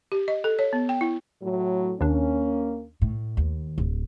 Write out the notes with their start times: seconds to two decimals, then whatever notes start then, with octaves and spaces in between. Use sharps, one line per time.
0.12 G4
0.28 D#5
0.44 A4
0.59 C#5
0.73 B3
0.89 G5
1.01 E4
1.43 A2 F#3
2.01 D#2 D#3 A#3 C#4 D4
3.02 A2
3.37 D#2
3.78 D1